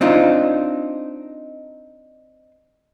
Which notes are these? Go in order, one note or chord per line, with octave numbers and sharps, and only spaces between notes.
C4 D4 D#4 F4